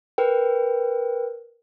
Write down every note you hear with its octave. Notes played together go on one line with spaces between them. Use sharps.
A#4 B4 G5